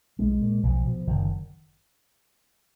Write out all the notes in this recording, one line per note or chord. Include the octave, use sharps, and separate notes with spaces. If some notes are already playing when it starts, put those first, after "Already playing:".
B1 G#3
A#2
B1 F3
B2
F#1 D#3